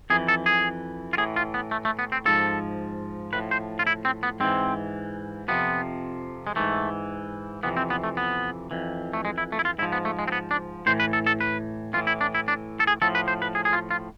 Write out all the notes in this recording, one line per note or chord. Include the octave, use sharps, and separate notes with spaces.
F2 E3 G#4
A4
G#4
F4
A2 E3 G#4
F4
B3
A3
A3
B3
C4
G#2 F3 A4
A2 F3 B4
C5
F4
E4
C4
B3
G#2 E3 C4
F2 C3 F3 B3
G#3
G#2 E3 A3
F2 C3 E3 B3
C4
B3
A3
B3
F2 E3
A3
G#3
E4
A3
E4
F4
G#2 F3 E4
B3
A3
G#3
C4
B3
D4
A2 E3 C5
B4
A4
A4
B4
A2 E3 F4
E4
D4
E4
D4
A4
G#4
A2 F3 A4
B4
C5
B4
G#4
G#4
F4
F4